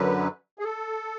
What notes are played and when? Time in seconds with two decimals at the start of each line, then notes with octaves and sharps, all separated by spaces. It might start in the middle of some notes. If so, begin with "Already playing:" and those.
Already playing: F#2 D3 F#3 B4
0.59 G#4
0.64 A4